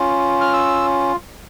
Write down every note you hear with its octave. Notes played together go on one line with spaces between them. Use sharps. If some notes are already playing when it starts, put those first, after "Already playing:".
Already playing: C#4 F4
F6
E6